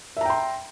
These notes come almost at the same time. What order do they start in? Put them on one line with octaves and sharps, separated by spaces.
E5 A#5 G5 C6